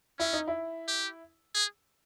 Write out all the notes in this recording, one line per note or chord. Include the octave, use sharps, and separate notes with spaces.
C#4 E4
D#4
E4
G4
G#4